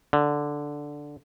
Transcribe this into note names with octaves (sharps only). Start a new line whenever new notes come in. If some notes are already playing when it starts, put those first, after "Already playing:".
D3